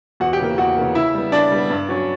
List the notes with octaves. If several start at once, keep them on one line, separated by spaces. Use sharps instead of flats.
E2 F#4 F#5
G4 G5
C#3 E3 A#3
E2 F#4 F#5
C#3 E3 A#3
C#3 E4 E5
G3 B3
C#3 D4 D5
G3 B3
G2
F#3 C#4